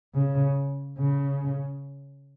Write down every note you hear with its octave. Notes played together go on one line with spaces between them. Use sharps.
C#3
C#3